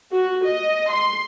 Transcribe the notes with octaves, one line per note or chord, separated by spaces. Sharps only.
F#4
D#5
C6